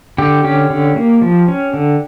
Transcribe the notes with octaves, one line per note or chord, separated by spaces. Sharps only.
D3 G4
C#4 G4
D3
A#3
F3
C#4
D3